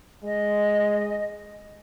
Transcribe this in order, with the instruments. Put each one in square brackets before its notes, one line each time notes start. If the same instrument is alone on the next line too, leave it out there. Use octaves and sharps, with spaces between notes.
[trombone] G#3 [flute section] D#5